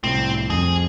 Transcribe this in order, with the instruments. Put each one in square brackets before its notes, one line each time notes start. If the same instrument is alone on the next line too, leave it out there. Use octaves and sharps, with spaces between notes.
[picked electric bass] C2 A2 [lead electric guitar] C4
[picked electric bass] F2 [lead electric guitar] G#4